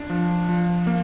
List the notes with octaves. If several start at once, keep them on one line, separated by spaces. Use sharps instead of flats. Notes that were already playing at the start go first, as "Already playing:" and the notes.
Already playing: D4
F3
F3
A#3